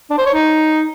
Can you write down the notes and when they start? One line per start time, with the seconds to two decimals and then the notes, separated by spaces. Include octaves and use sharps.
0.10 D4
0.18 C5
0.26 C#5
0.34 D#4